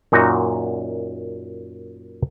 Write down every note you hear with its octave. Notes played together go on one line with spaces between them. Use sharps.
F#2 A#2 D#4 F#4 D#5 A#5